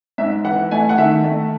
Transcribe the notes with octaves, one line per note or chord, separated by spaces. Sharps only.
G#2 E5
E3 F#5
A3 G#5
F#5
D#3 E5
A3